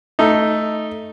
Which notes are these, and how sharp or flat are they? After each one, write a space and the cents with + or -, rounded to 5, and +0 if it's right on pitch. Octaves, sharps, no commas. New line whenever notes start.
A3 +0 D#4 +0